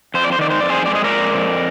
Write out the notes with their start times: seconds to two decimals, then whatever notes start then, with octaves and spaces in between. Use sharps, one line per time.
0.14 F2 C5
0.24 D5
0.32 C5
0.39 D#3 D5
0.50 C5
0.61 F2 D5
0.70 G#4 C5
0.86 G#3 D5
0.95 D#5
1.04 A#4 D5
1.10 F2
1.34 F2